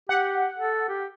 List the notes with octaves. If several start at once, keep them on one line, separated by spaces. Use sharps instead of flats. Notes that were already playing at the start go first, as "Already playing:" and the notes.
G4 F#5
A4
G4